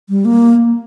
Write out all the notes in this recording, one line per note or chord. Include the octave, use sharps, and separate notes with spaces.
G3
A#3